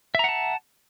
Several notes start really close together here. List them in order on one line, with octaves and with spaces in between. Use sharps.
E5 A#5 F#5 A5